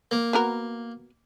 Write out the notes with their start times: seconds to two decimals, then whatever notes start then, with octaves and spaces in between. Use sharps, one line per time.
0.11 A#3
0.33 B3 F#4 A#4